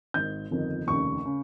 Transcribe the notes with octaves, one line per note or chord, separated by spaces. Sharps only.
G#1 G#2 D#3 G6
G1 F2 D#3
F1 D#2 C#3 C#6
C#3